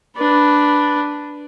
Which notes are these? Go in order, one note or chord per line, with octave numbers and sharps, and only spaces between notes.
D4 B4